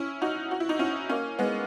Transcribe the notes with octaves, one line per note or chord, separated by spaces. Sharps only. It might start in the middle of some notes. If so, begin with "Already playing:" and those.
Already playing: C#4 E4
D#4 F#4
F#4
E4
D#4
C#4 E4
A#3 C#4
G#3 B3